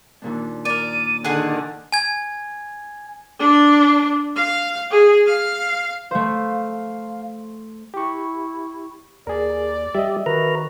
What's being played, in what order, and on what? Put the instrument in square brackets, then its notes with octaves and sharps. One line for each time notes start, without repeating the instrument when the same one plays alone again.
[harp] D#2 A#2 D4
[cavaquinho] A#4 D5 [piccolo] D#7
[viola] D3 D#3 [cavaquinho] G#4 F#5 G#5 [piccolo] F#6
[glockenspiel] G#5 G#6
[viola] D4
F5
G#4
F5
[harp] A3 C5 [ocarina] F5
[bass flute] E4 [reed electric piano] G4 C#6
[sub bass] D#2 [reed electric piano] G#4 A#4 [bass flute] D5
[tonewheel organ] G3 G4 [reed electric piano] D#5 E5
[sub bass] D#3 [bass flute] F#4 [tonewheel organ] A#4 B4 A#5